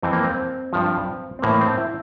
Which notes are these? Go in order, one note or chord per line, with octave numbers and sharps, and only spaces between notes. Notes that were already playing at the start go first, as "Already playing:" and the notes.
F2 E3 C4
A#3
C4
G2 F3
C4
A2 E3 A#3
C4
E4